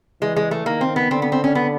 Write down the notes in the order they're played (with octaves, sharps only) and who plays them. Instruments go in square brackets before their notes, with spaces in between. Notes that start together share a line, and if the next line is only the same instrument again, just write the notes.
[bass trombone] E3 [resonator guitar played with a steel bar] G#3
[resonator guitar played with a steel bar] G#3
A3
[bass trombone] D#3 [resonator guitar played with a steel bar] A#3
[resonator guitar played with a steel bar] C4
B3
[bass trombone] D3 [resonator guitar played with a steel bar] C4
[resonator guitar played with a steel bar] B3
C4
C#4
B3